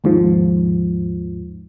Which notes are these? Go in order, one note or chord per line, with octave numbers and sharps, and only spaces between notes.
D#2 G#2 F3